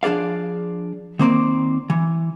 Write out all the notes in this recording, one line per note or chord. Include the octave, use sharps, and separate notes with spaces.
F3 D4 G#4 D5 F5
D#3 A#3 C4 D5
E3